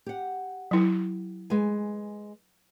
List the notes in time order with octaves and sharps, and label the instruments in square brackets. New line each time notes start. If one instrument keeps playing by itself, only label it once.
[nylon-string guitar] G4 F#5
[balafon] F#3 E4
[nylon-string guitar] G#3 B4 G#5